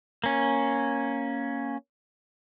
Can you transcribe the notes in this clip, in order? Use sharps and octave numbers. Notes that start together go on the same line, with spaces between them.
A#3 C#4